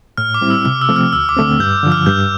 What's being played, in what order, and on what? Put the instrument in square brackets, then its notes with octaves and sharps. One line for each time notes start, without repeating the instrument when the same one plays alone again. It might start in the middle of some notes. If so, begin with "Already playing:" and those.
[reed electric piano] A2 [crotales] F6
[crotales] D6
[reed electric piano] G3 C4 E4
[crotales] E6
[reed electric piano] C3 [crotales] F6
[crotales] E6
[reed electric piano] F3 A3 C4
[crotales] F6
[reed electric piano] D2 [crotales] E6
[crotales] D6
[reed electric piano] D3 A3 C4
[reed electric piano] G2 [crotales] G6
[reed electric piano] D3 F3
[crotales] F6
[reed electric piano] G2 [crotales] G6